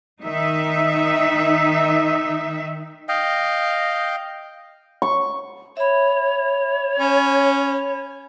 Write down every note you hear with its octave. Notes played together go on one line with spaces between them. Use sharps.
D#3 D#4 E5
D#5 F5 G5
C#6
C#5 E5 B5
C#4 B5